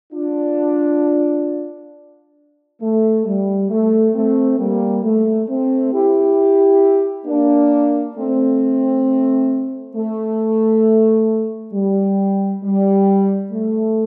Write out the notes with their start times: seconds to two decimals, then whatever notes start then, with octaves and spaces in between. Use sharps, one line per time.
0.13 D4 F4
2.81 A3
3.26 G3
3.70 A3
4.15 A3 C4
4.59 G3 A#3
5.04 A3
5.49 A3 C4
5.93 E4 G4
7.26 A#3 D4
8.16 A3 C4
9.95 A3
11.73 G3
12.63 G3
13.52 A3